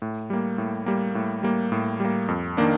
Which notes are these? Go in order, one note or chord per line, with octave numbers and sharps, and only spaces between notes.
A2
G3 A#3
A2
G3 A#3
A2
G3 A#3
A2
G3 A#3
F2
D#3 A#3 D4